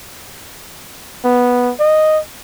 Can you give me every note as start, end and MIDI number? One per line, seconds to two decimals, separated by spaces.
1.24 1.72 59
1.79 2.19 75